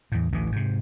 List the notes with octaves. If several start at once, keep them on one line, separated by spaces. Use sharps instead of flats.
E2 A2
A1 D2 E3
G#2 C3